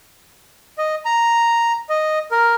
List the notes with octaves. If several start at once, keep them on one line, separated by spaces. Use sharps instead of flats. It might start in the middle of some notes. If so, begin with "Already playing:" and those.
D#5
A#5
D#5
A#4